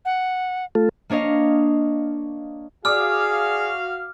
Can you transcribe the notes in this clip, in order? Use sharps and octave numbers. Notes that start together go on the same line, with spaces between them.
F#5
A3 F4 A4
A#3 D4 C#5 D#5 F5
F#4 G#4 D5 F5 D6 D#6 F6